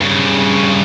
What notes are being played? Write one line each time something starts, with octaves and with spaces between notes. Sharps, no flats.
G2 C#3